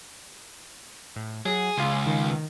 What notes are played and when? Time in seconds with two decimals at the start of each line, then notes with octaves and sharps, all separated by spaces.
1.16 A2
1.46 F#3 G#4
1.78 C#2 F4 G#5 C6
2.06 D#3